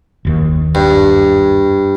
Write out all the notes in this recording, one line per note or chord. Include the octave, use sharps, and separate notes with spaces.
F#1 D#2
G2